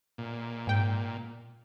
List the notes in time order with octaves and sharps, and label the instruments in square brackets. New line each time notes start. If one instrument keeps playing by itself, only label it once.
[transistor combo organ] A#2
[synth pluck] G#2 G5